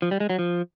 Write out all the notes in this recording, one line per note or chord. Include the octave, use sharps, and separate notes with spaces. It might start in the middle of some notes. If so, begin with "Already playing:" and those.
F3
G3
G#3
F#3
F3